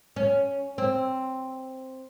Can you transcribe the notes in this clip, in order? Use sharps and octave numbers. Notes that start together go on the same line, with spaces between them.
C#4
C4